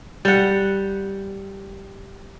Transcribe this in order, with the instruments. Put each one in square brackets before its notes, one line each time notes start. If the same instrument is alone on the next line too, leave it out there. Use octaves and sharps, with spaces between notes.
[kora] G3 F#5